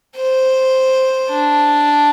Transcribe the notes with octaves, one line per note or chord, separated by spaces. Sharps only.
C5
D4